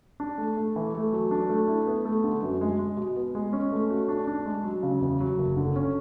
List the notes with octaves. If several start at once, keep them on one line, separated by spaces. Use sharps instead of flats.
D4
A3
A3
E3
A3
F#3
D4
A3
E4
B3
A3
D3
F#2
G#3
G#3
B2
B3
G#3
C#4
A3
F#4
D4
D4
G#3
F#3
C#3
E2
F#3
F#1
D3
C#4